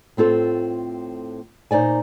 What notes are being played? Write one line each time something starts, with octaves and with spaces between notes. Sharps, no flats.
A2 C4 F4 A4 C5
A#2 D#4 C5 D5 G#5